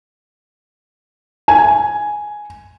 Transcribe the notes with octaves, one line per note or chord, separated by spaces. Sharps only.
G#5